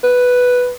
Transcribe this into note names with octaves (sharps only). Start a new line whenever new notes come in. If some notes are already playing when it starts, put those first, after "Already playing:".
B4